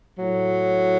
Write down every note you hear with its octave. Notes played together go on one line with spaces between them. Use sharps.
A2 F#3